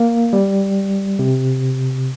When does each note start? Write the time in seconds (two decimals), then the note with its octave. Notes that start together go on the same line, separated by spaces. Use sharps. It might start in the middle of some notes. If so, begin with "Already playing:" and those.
Already playing: A#3
0.33 G3
1.19 C3